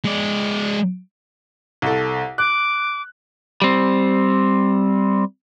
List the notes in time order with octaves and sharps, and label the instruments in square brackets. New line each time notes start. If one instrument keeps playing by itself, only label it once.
[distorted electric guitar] G#3 D5
[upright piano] C2 A4
[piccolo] D6 [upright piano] F#6
[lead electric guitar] G3 C4